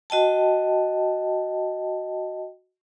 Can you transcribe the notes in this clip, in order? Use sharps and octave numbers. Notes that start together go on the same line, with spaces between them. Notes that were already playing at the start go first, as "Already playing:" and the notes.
F#4 D#5 G5 A5